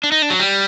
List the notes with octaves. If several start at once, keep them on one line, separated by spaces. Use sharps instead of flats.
D4
D#4
D4
F#3
G3